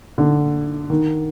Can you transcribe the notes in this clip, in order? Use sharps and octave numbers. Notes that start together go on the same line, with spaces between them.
D3
D#3